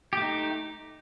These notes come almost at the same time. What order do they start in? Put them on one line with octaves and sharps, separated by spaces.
G4 A3 D#4